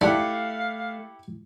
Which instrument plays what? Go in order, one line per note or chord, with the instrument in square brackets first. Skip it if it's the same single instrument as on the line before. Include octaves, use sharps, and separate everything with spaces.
[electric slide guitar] A3 [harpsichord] D4 [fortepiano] E4 G4 F#5 [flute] F5